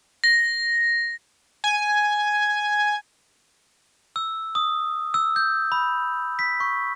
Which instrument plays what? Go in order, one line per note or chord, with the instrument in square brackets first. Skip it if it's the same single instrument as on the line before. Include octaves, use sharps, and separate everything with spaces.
[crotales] A#6
[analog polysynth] G#5
[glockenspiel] E6
D#6
E6
G6
B5
B6
C#6